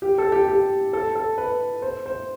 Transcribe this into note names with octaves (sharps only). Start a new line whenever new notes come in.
G4
A4
G4
G4
A4
A4
B4
C5
C5